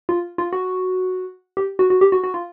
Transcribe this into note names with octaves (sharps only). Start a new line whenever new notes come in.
F4
F4
F#4
G4
F#4
F#4
G4
F#4
F#4
F4